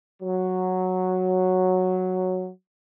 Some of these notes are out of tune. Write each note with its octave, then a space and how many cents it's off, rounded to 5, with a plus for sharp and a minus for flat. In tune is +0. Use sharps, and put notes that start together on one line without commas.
F#3 -5